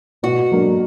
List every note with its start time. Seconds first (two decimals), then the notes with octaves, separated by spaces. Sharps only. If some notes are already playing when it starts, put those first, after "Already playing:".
0.23 B2 F#4
0.52 F#3 A#3 D4